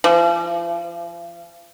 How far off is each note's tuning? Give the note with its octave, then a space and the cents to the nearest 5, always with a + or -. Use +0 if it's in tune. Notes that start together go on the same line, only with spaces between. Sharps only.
F3 -40